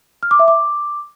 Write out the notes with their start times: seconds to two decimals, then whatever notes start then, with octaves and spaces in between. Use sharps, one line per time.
0.23 F6
0.31 D6
0.39 E5
0.48 D6